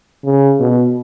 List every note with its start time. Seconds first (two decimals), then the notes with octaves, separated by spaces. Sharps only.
0.25 C#3
0.60 B2